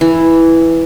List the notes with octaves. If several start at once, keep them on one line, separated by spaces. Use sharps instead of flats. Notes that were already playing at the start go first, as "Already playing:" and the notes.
E3